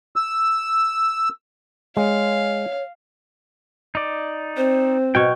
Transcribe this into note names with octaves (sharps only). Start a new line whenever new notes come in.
E6
G#3 C#5 F5
D#4 D5
C4 C5
B2 C#5 G5 C#6